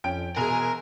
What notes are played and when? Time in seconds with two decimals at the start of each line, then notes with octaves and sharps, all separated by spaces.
0.04 F2 C#4 G5 D7
0.36 E1 B2 G#4 A#4 G#5 F7